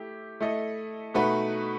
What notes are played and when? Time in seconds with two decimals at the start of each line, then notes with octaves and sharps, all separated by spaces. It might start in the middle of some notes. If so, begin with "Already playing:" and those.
Already playing: A3 E4 G4
0.41 A3 E4 A4 D#5
1.14 B2 A3 D#4 F#4 B4